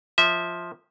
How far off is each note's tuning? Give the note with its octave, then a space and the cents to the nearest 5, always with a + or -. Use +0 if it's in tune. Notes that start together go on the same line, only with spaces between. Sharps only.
F3 +0 E5 -20